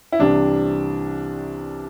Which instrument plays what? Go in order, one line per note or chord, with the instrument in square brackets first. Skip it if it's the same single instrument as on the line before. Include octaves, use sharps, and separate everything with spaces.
[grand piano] E4
C2 C3 E3 D4